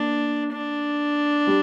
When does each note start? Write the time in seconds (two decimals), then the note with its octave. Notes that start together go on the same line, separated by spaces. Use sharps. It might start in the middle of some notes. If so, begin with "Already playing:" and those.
Already playing: A#3 D4
0.53 D4
1.47 G3